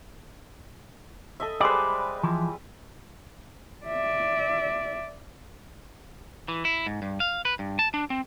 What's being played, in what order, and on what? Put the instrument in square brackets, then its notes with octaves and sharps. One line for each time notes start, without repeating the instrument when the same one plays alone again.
[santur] A4 D#5 E5
[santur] G3 G#3 B4 [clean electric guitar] C5 D5
[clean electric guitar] E3 F3
[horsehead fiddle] D5 E5
[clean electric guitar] E3
E4
G#2
G2
F5
B4
G2
A5
D4
C4